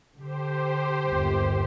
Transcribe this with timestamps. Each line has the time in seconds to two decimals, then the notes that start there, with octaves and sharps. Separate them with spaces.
0.17 D3 G4 C5
1.09 G1 D#2